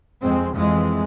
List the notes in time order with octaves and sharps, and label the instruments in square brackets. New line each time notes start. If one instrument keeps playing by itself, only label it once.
[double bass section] F2 G#3 C4
F2 E3 G#3